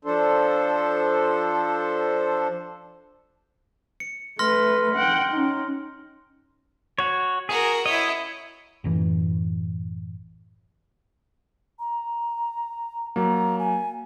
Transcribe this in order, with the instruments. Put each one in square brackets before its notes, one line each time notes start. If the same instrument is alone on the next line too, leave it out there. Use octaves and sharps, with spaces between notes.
[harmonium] F3 D4 A4 C5
[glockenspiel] C#7
[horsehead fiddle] A3 B4 [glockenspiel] C6 F6 A#6
[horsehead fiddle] F#5 G5
C#4 D#4
[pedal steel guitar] F#4 C#5
[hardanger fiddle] F#4 A#4 [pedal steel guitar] G#4
[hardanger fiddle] E4 C#5 [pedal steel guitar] D#5
[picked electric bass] A1 F#2 E3
[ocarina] A#5
[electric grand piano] F#3 A#3 [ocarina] A#5
[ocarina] G#5